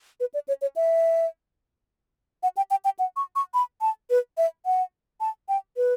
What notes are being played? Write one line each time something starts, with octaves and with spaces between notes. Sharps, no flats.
B4
D5
C#5
C#5
E5
F#5
G5
G5
G5
F#5
C#6
C#6
B5
A5
B4
E5
F#5
A5
G5
B4